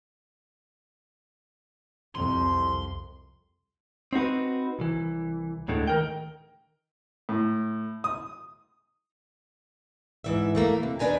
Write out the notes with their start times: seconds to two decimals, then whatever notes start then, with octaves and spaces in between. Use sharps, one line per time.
2.15 C2 F2 C6
4.13 C4 D#4 F#4 B4
4.79 C2 E3
5.68 D2 A2 D3 G#3
5.87 D#3 A#4 G5
7.29 A2
8.04 D#6
10.24 G#2 E3 E5
10.55 E3 A3 A#3
10.83 C3
10.99 D#2 D#3 D4 B4 G#5 A#5